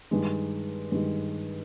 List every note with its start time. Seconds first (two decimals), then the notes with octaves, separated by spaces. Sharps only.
0.11 G2 D#3 G#3
0.92 G2 D#3 G#3